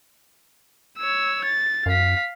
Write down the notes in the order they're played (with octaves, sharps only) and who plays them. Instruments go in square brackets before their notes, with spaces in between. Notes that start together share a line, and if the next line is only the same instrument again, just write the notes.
[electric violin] C#5 E6
A6
[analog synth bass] F#2 [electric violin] F5 B6